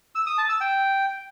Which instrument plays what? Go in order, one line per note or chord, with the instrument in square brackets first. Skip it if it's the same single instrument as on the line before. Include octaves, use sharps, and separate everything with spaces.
[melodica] E6
D#6
A5
E6
G5